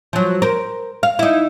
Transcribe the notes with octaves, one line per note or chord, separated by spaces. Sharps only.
F3 F#3
A#4 C5
F5
D#4 E4